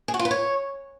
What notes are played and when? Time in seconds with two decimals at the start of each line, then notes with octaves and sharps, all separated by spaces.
0.08 G#4
0.14 F#4
0.19 F4
0.25 B4
0.31 C#5